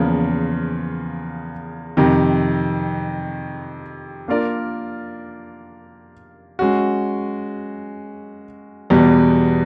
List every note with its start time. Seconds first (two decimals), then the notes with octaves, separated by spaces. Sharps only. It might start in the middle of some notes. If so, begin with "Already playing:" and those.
Already playing: E2 C#3 F3 A#3
1.97 F2 C3 D#3
4.28 A#3 D4 F4 A#4 D5
6.59 G#3 C#4 F#4
8.90 E2 B2 G3